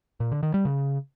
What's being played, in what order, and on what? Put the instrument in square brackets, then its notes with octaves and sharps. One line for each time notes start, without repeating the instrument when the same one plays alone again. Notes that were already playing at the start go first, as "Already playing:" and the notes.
[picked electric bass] A#2
D3
D#3
G3
C#3